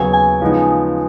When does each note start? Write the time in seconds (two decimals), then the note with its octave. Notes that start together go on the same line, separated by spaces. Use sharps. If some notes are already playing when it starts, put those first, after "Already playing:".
Already playing: D#2 C#3 F#3 B3 G#5
0.13 G#5
0.41 C#3 F3 G#3 B3 D#4